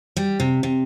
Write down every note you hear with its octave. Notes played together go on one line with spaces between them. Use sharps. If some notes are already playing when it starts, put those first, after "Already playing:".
G3
C3
C3